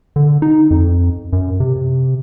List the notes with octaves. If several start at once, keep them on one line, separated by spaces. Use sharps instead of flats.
D3
D#4
F2
F#2
C3